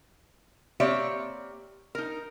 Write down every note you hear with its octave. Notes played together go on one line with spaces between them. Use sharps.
A#3 C4 G4 C#5 D5 E5
D#4 A#4